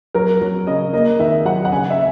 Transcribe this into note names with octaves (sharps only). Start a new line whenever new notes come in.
F#3 A#4
F#3
C#3 D#5
A#3 D#5
D#3 E5
F#3 F#5
F#5
C#3 G#5
E5